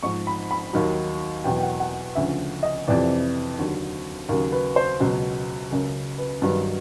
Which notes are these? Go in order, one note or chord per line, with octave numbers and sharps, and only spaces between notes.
G#2 F3 C#6
B5
B5
D#2 D#3 F#3
E2 B2 F#3 G5
G5
F#5
F#5
D2 C#3 F3 E5
D#5
F2 C3 E3 D5
D#2 D3 F#3
D#2 C#3 F#3 A#4
B4
C5
C#2 B2 F#3
C#2 C#3 F#3 A#4
B4
G2 D#3 F#3 B4